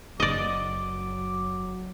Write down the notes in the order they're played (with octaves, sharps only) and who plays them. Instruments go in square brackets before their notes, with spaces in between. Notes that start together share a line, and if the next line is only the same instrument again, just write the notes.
[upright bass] F#1 F#2 [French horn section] F#3 [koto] D5 D#5 [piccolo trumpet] D6